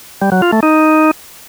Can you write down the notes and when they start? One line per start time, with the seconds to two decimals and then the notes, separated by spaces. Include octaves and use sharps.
0.22 G3
0.32 F#3
0.42 F4
0.52 A3
0.63 D#4